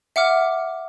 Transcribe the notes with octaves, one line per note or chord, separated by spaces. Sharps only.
E5 F#5 D6 F6